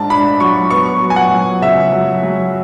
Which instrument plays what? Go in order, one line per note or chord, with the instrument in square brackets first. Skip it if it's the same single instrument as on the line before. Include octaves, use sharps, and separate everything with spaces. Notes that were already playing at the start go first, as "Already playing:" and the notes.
Already playing: [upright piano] G#2 D4 A5
D4 B5
F#3 C#6
B3 C#6
F#3
G#5
F#5
F#3
C#3 E5
F#3
F#3